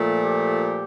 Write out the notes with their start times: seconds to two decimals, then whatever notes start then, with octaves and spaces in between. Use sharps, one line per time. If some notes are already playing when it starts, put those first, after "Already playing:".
Already playing: A#2 F3 A3
0.22 G4